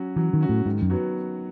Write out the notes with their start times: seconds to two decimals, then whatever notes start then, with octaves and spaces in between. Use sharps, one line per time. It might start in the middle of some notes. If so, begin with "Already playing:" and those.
Already playing: F#3 C#4 F#4
0.16 E3 F#3
0.33 D#3
0.41 C#4 F#4
0.49 A2
0.66 G#2 D#3
0.82 F#2
0.90 F#3 B3 F#4